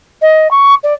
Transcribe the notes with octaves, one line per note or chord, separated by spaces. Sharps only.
D#5
C#6
D5